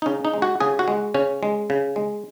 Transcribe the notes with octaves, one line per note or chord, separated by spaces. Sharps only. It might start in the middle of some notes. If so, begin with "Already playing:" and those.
D#4
C#3 C#4
D#4
G#3
F#4
C#3 G#4
F#4
G#3
C#3 C#4
G#3
C#3
G#3